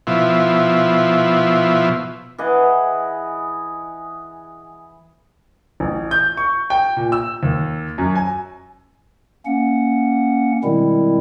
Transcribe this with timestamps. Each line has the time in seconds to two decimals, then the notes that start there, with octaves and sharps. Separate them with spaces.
0.07 B2 F3 E4
2.38 E3 G#4 D#5 F#5
5.80 A1
6.11 G6
6.37 C#6
6.70 G5
6.97 A#2
7.12 E6
7.43 D#2
7.98 F#2
8.15 G#5
9.46 A#3 C#4 F#5
10.64 B2 D#3 G3 G#3 C4 E4